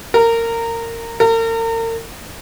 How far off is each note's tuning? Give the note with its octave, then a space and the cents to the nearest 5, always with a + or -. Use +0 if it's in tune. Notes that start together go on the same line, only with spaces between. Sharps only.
A#4 -20
A#4 -40